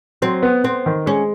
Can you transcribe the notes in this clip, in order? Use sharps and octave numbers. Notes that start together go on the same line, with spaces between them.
F#3 C4
B3
B3 C4
D#3
G#3 C#4